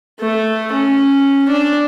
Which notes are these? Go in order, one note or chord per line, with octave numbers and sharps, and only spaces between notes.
A3
C#4
D4